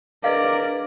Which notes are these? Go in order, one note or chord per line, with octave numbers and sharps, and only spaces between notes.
D4 G#4 A#4 B4 D5 D#5 F5